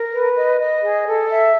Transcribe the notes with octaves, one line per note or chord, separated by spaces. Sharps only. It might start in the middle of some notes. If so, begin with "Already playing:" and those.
Already playing: A#4
B4
D#5
D#5
G#4
A4
E5